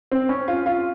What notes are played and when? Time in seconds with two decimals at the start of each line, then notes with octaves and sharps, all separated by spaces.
0.12 C4
0.29 C#4
0.48 F4
0.66 F4